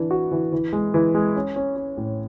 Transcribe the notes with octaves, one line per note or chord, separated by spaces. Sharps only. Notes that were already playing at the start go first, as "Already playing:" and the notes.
Already playing: E3 D4
F#4
E3
E3
G#3
E3
G#3
C#4
C#4
C#4
A2